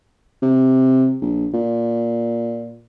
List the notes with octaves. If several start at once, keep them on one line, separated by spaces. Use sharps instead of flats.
C3
A#1
A#2